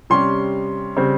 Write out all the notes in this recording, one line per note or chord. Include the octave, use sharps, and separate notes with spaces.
C3 G3 C#4 C6
C#3 G3 C4